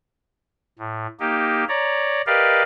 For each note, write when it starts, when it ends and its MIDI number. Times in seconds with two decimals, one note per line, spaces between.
0.79 1.07 45
1.20 1.64 58
1.20 1.64 63
1.20 1.64 67
1.69 2.22 73
1.69 2.22 74
1.69 2.22 82
2.27 2.63 67
2.27 2.63 70
2.27 2.63 71
2.27 2.63 74
2.27 2.63 75
2.27 2.63 77